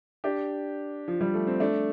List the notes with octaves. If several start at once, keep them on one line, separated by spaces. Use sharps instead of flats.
D4 G4
F3
G3
A3
C4
A3 D4